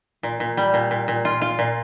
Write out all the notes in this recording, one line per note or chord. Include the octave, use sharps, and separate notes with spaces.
A#2
A#2
G3
A#2
A#2
A#2
F4
F4
A#2